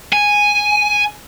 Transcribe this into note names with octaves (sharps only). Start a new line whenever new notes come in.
G#5